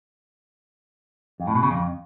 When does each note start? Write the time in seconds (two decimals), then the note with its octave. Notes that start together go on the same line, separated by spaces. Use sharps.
1.40 F2
1.47 A2
1.55 B2
1.63 C#3
1.71 F2